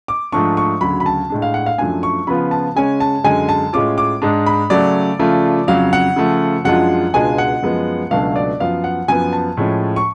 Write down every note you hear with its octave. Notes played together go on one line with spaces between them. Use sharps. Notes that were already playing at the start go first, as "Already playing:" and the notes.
D6
G#2 F3 A3 D4 C#6
C#6
D2 C#3 F#3 B5
B5
A5
A2 G#3 D4
F5
F#5
F5
F#2 F3 A3 D4 G#5
C#6
C#3 F3 B3 F4 B5
A5
C#3 G#3 C#4 G#5
A5
F#2 D3 G#3 G#5
A5
A2 G#3 C#4 F4 D6
D6
G#2 G#3 D4
B5
C#3 F#3 A3 D5
C#3 F3 A3 F4
F2 C#3 F#3 F5
F#5
C#3 F3 A3
F#2 F3 G#3 D4 F4 F#5
C#2 B2 G#3 D4 F4 G#5
F#5
F#2 F3 G#3 B3
C#2 B2 F#3 A3 D4 F5
D5
F#2 F3 B3 F5
F#5
F#2 F3 B3 G#5
A5
A2 F3 G#3 C#4
C#6